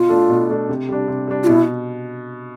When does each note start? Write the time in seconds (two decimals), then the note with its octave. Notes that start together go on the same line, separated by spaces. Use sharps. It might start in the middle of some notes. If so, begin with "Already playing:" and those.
Already playing: B2 F4
0.09 A3 D4 A4
0.29 B2
0.50 A3 D4 A4
0.69 C3
0.89 G3 D4
1.08 C3
1.28 G3 D4
1.43 F4
1.47 B2 E4